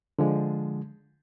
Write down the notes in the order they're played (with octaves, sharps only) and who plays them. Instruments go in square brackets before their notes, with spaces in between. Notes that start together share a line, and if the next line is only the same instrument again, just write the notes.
[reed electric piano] D3 F3 G#3